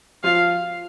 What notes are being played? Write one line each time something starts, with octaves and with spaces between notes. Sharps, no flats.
F3 F4 F5